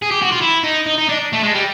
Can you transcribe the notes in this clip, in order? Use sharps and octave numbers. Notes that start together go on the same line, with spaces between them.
G#4
G4
F#4
F4
E4
D#4
D#4
D#4
D4
A3
G#3
G3